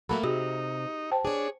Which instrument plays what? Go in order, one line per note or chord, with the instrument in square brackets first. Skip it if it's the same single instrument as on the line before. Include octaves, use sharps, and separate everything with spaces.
[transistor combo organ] F#3 [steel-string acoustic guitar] A3 A#3 A4 [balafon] B5
[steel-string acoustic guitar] C3 [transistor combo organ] D#4 [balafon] F#4 G#4
[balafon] C5 G5 A5
[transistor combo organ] D4 [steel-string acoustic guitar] G#4 C#5